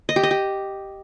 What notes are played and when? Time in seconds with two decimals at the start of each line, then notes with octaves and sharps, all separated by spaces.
0.09 D#5
0.16 G4
0.23 D#5
0.31 G4